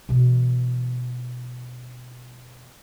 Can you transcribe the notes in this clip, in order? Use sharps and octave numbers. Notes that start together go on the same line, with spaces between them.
B2 E3